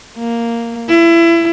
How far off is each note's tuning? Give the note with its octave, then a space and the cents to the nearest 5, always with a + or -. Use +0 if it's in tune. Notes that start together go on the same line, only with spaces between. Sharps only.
A#3 -5
E4 +25